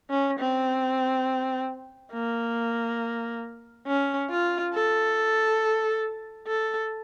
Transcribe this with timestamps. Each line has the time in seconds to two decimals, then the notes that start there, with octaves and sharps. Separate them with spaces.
0.10 C#4
0.39 C4
2.13 A#3
3.87 C#4
4.30 F4
4.74 A4
6.48 A4